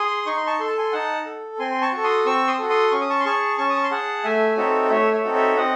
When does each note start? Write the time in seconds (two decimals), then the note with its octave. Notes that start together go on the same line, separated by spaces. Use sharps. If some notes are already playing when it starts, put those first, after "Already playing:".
Already playing: G#4 C6 D#6
0.26 D#4 C#6
0.37 C6
0.46 A5 C#6
0.60 A4 C6
0.68 A5
0.78 G#5 C6
0.93 D#4 F#5 A5
1.25 A4
1.59 C4 G#5 C6
1.71 C6
1.82 A5 C#6
1.92 F#4 A4
2.04 C6 D#6
2.26 C4 C#6 E6
2.47 C6 D#6
2.58 F#4 A4
2.69 C6 D#6
2.91 C#4 C#6
3.01 D#6
3.10 A5 C#6
3.20 C6
3.24 G#4 A5 C#6
3.58 C#4 A5 C#6
3.70 D#6
3.76 C#6
3.83 C6
3.91 G#4 F#5 A5
4.24 A3 E5 G#5
4.57 C4 D#4 F#4 A4 C#5 E5
4.90 A3 C#5 E5
5.13 C#5 E5
5.24 C4 D#4 F#4 A4
5.35 C#5 E5
5.57 C4 D#5 F#5